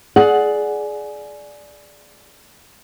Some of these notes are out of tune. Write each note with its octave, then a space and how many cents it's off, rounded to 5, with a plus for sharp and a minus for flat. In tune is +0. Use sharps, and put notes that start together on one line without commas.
G#4 +20 D5 +0 F#5 +0